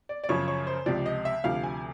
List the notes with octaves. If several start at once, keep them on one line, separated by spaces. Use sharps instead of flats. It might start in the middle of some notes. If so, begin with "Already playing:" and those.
D5
D5
F#2 C#3 F3 C#5
C#5
C5
C#2 C3 F3 D5
D#5
E5
D2 C3 F3 F5
G#5